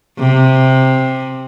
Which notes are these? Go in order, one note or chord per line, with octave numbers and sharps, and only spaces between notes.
C3